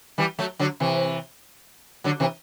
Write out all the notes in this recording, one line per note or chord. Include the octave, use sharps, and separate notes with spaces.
E3 G3
F#3 A3
D3 F#3
C3 E3
D3 F#3
C3 E3